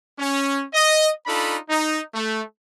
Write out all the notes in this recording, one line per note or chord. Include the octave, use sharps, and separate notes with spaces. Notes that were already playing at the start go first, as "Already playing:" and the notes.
C#4
D#5
D4 D#4 F4 A4 B5
D#4
A3